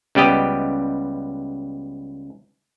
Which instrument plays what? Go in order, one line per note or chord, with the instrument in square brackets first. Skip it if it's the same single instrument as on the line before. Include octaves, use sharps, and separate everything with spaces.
[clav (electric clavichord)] C#2 G3 B3 G4 D#5